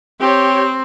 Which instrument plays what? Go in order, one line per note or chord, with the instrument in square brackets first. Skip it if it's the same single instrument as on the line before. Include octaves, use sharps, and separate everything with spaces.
[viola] C4 [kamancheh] G4 C#5